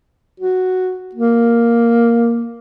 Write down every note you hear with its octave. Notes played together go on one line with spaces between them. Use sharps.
F#4
A#3